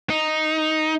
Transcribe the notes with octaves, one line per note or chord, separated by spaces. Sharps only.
D#4